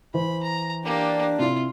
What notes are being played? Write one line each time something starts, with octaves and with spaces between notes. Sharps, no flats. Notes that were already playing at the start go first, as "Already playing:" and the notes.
E3 C5 B5
A#5
A#3 D4 G4 D5
C3 E4 F4